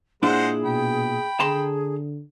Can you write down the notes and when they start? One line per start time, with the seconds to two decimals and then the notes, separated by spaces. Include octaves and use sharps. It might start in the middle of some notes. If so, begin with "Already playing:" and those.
0.23 A#2 G#3 D4 E4 G#4 C5 F#5
0.64 B2 G5 B5
1.40 D3 G#4 A5 A#5 C6